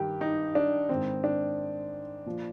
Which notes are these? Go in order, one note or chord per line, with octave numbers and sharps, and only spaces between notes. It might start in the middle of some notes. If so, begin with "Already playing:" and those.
Already playing: G2 D#3 G4
D#4
D4
G#2 D#3 C4
D4
A#2 F3